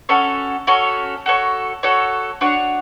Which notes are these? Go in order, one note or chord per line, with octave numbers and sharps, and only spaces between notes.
C#4 F#4 A4 C#5
C#4 F#4 A4 C#5
F#4 A4 C#5
F#4 A4 C#5
D4 F#4 C#5 F#5